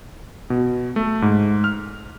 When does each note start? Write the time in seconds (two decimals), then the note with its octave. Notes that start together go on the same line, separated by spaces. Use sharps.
0.50 B2
0.96 A3
1.22 G#2
1.64 F6